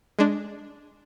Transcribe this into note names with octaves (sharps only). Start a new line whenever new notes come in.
G#3 D4